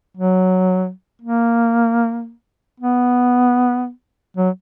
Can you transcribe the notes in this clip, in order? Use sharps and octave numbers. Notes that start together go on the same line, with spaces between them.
F#3
A#3
B3
F#3